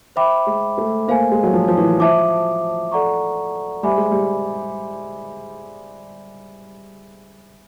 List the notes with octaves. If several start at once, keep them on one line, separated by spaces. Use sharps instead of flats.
C5 E5 G5 B5 D6
G#3
A3
A#3 C5 F5 G#5
G#3
F#3
F3
F3
E3
F3 C5 E5 A5 D6
A4 D5 F#5 A#5 C#6
G3 C5 E5 G#5 B5 D6
G#3
G3